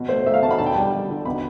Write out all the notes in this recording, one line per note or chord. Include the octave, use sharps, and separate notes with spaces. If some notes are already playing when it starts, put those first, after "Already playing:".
Already playing: B2
A3 C5
A3 E5
F5
B2 A5
B5
D3 A5
G5
G3 A5
G3
D3
B2 B5